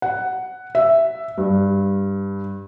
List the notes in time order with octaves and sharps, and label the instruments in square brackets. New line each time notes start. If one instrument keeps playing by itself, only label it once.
[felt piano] F#5
E5
G2